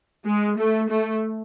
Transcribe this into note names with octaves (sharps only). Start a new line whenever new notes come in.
G#3
A3
A3